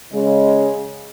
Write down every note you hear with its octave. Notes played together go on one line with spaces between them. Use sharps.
C#3 G#3